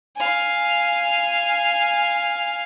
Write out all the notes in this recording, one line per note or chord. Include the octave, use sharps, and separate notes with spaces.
F5 G#5